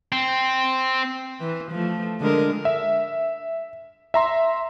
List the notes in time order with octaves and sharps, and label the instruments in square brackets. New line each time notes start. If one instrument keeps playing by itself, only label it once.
[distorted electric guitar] C4
[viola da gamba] E3
F3 A3
D3 G#3 A#4
[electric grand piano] E5
E5 A#5 C6